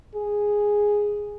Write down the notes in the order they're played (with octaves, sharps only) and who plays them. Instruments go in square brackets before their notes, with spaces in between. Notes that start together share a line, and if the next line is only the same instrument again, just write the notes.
[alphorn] G#4